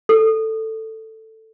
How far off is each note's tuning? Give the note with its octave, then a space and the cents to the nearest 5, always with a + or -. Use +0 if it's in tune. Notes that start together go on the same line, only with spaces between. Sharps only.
A4 +10